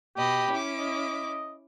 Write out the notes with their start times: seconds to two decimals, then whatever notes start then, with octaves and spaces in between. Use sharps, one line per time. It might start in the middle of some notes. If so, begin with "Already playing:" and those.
0.16 B2 G4 D#5 B5
0.50 C#4 E4 D6
0.78 D#5